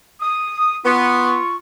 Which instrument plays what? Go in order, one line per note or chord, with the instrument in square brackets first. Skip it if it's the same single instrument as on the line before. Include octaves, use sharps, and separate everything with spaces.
[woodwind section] D#6
[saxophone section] B3 [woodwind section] F4 C#6